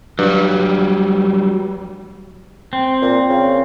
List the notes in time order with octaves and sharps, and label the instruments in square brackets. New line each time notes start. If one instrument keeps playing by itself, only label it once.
[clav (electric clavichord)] G2 [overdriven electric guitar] F#3 G3
[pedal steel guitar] C4
[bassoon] A#2
C#3